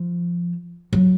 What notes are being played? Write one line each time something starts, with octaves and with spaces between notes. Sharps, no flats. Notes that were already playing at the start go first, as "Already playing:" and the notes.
Already playing: F3
F#3